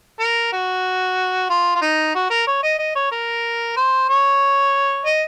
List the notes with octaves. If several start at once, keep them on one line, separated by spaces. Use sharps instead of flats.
A#4
F#4
F4
F4
D#4
F#4
A#4
C#5
D#5
D#5
C#5
A#4
C5
C#5
D#5